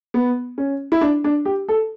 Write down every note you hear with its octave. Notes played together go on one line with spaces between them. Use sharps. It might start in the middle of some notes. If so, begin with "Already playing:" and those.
B3
C#4
E4
D4
D4
G4
A4